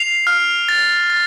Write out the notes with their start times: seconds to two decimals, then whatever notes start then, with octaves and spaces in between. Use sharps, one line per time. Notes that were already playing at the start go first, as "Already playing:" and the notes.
Already playing: C7 F7
0.27 F6
0.69 A6
1.10 A6